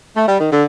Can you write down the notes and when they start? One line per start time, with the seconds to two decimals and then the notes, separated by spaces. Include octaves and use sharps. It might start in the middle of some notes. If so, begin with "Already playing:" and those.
0.16 A3
0.27 G3
0.39 D#3
0.51 D3